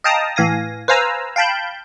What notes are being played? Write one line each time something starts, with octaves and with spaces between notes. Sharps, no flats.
D#5 F5 G5 A5 A#5 D#6
A2 E3 F5 G#5 A#6
B4 C5 F5 G#5 A#5 E6
F5 G5 A5 B5 G6